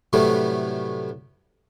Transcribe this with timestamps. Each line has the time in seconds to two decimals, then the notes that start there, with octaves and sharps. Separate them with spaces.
0.13 A2 C3 E3 F#3 G3 A3